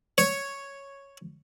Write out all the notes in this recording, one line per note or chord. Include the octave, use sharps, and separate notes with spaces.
C#5